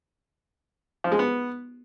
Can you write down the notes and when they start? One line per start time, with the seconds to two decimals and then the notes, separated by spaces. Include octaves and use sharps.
1.04 F3
1.12 G#3
1.19 B3